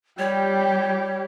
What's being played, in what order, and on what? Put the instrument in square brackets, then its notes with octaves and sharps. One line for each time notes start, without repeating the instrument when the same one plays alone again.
[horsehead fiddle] G3 G4 [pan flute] C#5